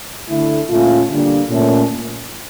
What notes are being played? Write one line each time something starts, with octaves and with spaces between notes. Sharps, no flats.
D3 A3 E4
A#2 A3 C#4 F4
D3 G3 A#3 D4
A#2 A3 C#4